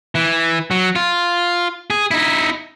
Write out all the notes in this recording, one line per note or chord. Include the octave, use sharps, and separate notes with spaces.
E3
F#3
F4
G#4
D#4 E4